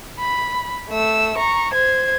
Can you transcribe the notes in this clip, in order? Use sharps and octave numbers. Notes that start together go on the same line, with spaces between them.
B5
A3 E6
A#5 C#6
C5 G#6